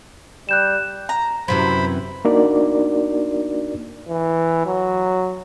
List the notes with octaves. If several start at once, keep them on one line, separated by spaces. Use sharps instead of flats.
G3 F#6 G6 E7
A#5
F#2 C3 E3 C5 B5
A#3 D4 D#4 F#4 A#4 D5
E3
F#3